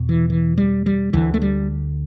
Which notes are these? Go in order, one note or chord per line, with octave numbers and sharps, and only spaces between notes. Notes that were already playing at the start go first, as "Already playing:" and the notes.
Already playing: E2 B2
E3
E3
G3
G3
D2 D3 E3
A3
G3